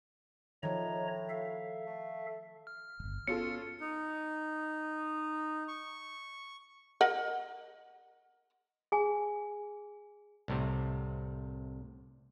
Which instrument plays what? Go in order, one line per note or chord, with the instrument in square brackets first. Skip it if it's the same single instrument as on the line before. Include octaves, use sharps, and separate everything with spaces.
[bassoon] A2 [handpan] D#3 F3 [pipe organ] C#5 D#5 A#5
[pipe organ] A4 E5 F5
[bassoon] A3
[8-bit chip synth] F6
[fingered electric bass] D1 G1
[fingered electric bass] B3 [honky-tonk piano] C#4 F4 A4 [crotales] C#7
[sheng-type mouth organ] D#4
C#6
[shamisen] A#4 D#5 F#5
[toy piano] G#4 G#5
[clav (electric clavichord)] C2 A2 C3